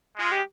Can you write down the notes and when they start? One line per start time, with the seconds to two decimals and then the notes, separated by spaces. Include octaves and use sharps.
0.16 G#3 F4
0.32 G4